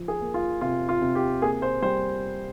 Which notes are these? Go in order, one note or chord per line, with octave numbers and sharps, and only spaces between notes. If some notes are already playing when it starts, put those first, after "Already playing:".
Already playing: F3
G#4
A#3
F4
C3 F4
F4
C3
G4
A#3 G#4
C5
G3 C5